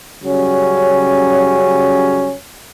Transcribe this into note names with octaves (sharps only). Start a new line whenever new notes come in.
C#3 F#3 G3 C#4